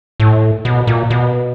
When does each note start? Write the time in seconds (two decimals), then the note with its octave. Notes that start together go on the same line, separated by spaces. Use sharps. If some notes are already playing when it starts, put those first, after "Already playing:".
0.20 A2
0.65 B2
0.87 A#2
1.10 B2